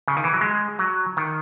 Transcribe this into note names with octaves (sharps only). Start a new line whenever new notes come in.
C#3
D#3
E3
F#3
G#3
F#3
D#3